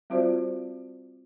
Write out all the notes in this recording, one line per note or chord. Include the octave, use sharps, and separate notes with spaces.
G3 C4 F4 F#4 C5 D5